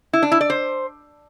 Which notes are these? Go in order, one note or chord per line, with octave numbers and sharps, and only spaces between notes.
E4
D4
E4
D5
C5